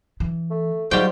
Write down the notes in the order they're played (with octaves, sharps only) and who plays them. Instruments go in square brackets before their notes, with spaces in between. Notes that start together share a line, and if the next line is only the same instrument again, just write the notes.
[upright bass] E3
[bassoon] A3
[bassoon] G#2 [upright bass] F#3 [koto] G3 G5 [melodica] F4 F#4 C5